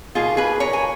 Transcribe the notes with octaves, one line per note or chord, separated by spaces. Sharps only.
B2 A#3 D#4 F4 G#4
G#4 B4
A#4 C#5
G#5